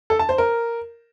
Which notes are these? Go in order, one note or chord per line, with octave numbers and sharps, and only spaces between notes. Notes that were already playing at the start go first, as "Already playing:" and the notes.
A4
A5
C5
A#4